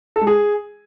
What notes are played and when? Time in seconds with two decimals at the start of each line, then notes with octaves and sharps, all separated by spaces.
0.16 A4
0.21 G#3
0.27 G#4